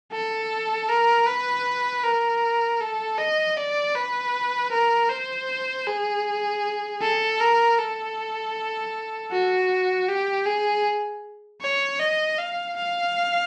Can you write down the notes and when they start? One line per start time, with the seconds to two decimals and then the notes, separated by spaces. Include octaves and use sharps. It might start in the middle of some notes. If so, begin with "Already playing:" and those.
0.12 A4
0.89 A#4
1.27 B4
2.04 A#4
2.81 A4
3.18 D#5
3.57 D5
3.95 B4
4.72 A#4
5.10 C5
5.88 G#4
7.02 A4
7.40 A#4
7.79 A4
9.32 F#4
10.09 G4
10.46 G#4
11.62 C#5
12.00 D#5
12.39 F5
12.77 F5